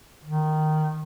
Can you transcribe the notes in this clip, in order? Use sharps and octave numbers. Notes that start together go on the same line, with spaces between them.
D#3